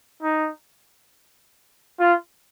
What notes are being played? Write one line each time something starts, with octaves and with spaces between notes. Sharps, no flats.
D#4
F4